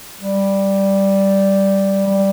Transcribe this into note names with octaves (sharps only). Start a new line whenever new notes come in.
G3
G3